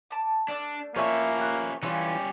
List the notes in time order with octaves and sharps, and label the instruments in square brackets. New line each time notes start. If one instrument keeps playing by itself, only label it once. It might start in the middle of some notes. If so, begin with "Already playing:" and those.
[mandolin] A5 D6
[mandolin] A3 D5 F6 [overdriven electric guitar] D4
[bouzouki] F3 C#5 E5 [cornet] A#3 [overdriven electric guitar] C#4 B4
[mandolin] G4 F#6
[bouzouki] E3 F4 [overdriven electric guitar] G3 C#4